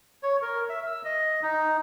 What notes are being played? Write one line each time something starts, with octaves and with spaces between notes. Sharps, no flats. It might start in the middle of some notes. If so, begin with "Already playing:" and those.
C#5
A#4
E5
E6
D#5
D#4